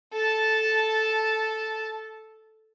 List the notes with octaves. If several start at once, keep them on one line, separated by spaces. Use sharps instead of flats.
A4 A5